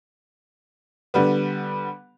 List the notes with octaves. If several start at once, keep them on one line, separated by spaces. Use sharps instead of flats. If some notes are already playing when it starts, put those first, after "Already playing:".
D3 G3 B3